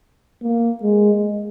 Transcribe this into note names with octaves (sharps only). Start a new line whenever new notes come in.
A#3
G#3